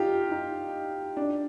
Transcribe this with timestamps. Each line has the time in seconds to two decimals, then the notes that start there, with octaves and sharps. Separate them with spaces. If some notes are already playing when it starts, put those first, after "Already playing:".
Already playing: D#4 F4 G4
0.31 D#4
1.17 D4